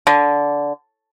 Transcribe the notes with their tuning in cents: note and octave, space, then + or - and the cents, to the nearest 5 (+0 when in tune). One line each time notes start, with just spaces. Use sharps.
D3 -15